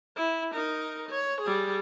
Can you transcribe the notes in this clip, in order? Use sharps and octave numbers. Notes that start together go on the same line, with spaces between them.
E4
D#4 A#4
C#5
G3 G#4